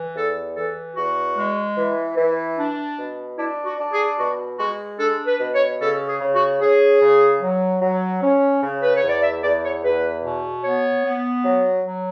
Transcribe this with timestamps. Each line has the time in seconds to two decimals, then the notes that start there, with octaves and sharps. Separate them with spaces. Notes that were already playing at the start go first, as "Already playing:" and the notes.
Already playing: E3
0.15 E2 A4
0.56 E3 A4
0.96 E2 F#4
1.36 G#3
1.77 E3
2.17 E3
2.58 D4
2.98 B2
3.38 D4 E4
3.65 F#4
3.79 D4
3.93 G#4
4.19 B2 F#4
4.59 G#3 F#4
4.99 D4 A4
5.27 B4
5.40 B2
5.54 C#5
5.80 C#3 A4
6.08 G#4
6.20 C#3
6.35 F#4
6.61 C#4 G#4
7.01 C#3
7.41 F#3
7.82 F#3
8.22 C#4
8.63 C#3
8.81 B4
8.96 C#5
9.03 E2
9.09 D5
9.23 E5
9.43 E2 D5
9.64 C#5
9.84 E2 B4
10.24 B2
10.64 B3 C#5
11.05 B3
11.44 F#3
11.85 F#3